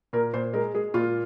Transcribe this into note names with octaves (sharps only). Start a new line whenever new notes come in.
A#2 A#4
A#2 C5
G#3 A#4
G#3 G#4
A#2 F4